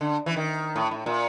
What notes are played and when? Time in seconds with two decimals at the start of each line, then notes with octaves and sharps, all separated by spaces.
0.01 D3
0.26 E3
0.37 D#3
0.76 A2
0.91 A2
1.06 A#2